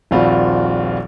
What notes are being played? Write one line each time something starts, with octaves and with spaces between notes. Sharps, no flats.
D#1 A#1 C4 F4 F#4 B5